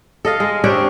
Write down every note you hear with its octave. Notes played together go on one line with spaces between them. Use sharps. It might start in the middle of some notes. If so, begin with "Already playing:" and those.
A4 D#5 F5
G#3
C4 D4 G4 C#5